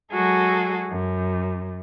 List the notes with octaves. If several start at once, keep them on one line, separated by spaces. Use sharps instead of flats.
F#3 G#3 F#4 G#4 A4
F#2